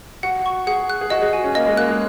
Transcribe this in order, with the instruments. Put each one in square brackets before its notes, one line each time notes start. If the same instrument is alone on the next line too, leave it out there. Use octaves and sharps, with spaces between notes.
[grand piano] F#4 [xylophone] F#5
[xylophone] C#6
[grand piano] G#4 [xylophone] F#5
[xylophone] F#6
[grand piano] G#4
[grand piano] F#4 [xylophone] D#5
[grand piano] G#4
[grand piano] F#4 [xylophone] G#5
[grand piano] C#4
[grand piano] A#3 [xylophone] D#5
[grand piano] G#3
[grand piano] A#3 [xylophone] F#6
[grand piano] G#3